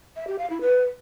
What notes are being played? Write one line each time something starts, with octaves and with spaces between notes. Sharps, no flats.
E5
G4
F5
E4
B4